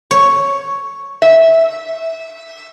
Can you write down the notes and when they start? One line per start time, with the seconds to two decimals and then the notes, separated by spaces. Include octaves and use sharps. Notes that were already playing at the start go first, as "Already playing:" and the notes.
0.11 C#5
1.22 E5